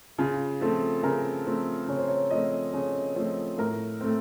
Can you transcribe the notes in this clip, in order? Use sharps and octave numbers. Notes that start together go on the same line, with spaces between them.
C#3 F4
F3 A3 C4 A4
C#3 A#4
F3 A3 C4
C#3 C#5
C5
C#5
F3 A3 C4 D#5
C#3 C#5
F3 A3 C4 C5
A2 A#4
A3 C4